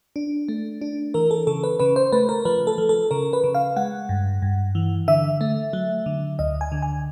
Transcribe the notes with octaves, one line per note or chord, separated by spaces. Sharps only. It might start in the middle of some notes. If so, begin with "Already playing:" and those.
D4
A3
D4
E3 A#4
A4
C#3 A4
B4
C#3 B4
C5
A3 B4
A#4
F3 B4
A4
F3
A4
C#3 A#4
B4
C#3
F5
G#3 F#5
G2
G2
E3
D3 E5
A3
F#3
D3
D2 D#5
G#5
D3
G#5